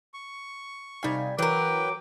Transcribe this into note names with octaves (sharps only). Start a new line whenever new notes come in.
C#6
C3 G3 D#4 F5 G#5
E3 F#3 A#4 B4 G5 D6